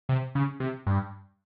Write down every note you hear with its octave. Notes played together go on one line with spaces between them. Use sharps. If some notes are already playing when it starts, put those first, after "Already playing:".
C3
C#3
C3
G2